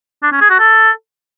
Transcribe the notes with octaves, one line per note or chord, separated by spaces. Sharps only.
D4
C#4
G#4
F#4
A4